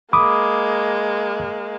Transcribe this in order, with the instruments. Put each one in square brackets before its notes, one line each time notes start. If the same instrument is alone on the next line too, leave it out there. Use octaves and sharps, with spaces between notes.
[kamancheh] G#3 A#3 [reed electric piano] B5 D6 D#6